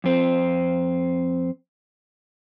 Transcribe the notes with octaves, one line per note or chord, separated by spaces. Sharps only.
F2 C4